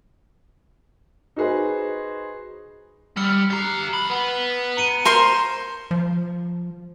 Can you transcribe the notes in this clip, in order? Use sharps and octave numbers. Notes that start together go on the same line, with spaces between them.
D#4 F#4 G#4 B4 C5
G3 E6 F6 C#7
G4 A#5 C7 C#7
F2 B5
B3
A#5 C#7 D#7
A#4 C5 C6
F3